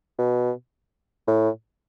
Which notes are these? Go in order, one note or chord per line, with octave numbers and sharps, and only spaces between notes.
B2
A2